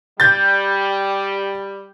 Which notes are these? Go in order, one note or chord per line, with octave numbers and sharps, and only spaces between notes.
G3 G6 A6